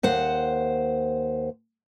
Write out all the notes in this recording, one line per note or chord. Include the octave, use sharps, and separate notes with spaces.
D#2 C5 F#5